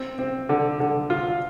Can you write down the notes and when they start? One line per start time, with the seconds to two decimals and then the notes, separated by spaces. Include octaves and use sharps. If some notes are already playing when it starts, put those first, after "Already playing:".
Already playing: C4
0.19 C4
0.49 D3
0.80 D3
1.10 F4